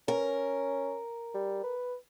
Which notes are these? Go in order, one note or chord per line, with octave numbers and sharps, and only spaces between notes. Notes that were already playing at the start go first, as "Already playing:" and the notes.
C#4 A#4
G3
B4